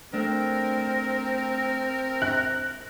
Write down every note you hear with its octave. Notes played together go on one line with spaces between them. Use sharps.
A3 C4 D4 A#4
F#6